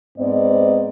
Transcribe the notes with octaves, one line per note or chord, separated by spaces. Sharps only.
G#2 B3 C4 D5 D#5